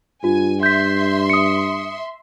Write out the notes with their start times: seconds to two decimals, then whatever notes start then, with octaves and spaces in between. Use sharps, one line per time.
0.24 G2 F4 G#5
0.63 E5 C6 G6 B6
1.30 D#6 C#7